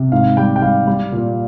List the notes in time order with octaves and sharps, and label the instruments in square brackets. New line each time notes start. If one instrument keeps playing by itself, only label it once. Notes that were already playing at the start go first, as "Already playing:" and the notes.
Already playing: [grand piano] C3
G#2 F5
G3 G5
G5
G3 F5
G3
A#2